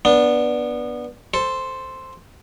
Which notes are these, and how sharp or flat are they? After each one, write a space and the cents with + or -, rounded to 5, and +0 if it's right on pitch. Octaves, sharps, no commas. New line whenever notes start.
B3 -15 D4 +0
A4 +0 C5 +0